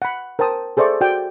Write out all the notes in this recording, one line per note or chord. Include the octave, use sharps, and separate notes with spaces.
F#5 B5
A#4 C5 G5 A5 D#6
G#4 A4 C5 D5 E5 C#6
F#4 D5 G5